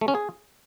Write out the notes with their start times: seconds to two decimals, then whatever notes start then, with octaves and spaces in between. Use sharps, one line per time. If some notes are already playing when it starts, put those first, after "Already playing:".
0.01 A3
0.08 C#4
0.15 G#4